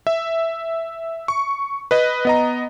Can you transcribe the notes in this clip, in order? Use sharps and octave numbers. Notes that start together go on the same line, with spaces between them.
E5
C#6
B4 D#5
B3 D#5 A#5